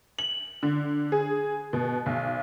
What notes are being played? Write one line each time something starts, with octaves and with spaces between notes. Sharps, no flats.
F#7
D3
G#4
B2
B1